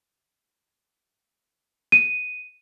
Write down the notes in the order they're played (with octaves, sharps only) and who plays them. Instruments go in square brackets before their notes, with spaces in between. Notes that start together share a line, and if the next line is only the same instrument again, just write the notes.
[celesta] D#7